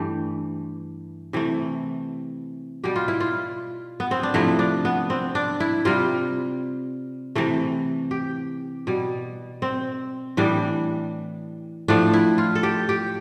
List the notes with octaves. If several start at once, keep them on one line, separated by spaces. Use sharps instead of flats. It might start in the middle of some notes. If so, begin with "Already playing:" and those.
Already playing: G2 E3 A3 G4
C3 E3 A3
B2 G3 G4
F4
E4
F4
B3
C4
D4
C3 F3 A3 E4
D4
B3
C4
D4
E4
C3 G3 F4
C3 E3 A3
G4
B2 G3
C4
A2 E3 G3 D4
A2 F3 A3 D4
E4
F4
A4
G4
G4